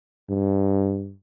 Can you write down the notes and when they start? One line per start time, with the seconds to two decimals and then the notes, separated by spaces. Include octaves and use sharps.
0.30 G2